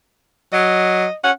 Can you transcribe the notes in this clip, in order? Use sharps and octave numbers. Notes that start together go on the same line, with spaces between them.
F#3 D#5
C#4 F#5